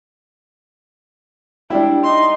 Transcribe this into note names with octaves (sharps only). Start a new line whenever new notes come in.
G3 D4 E4
D#4 C6